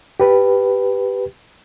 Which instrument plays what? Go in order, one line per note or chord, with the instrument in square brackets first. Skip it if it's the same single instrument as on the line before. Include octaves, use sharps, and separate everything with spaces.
[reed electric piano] G4 B4